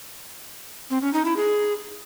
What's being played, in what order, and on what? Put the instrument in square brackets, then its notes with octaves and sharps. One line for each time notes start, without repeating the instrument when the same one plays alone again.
[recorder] C4
C#4
D#4
E4
G#4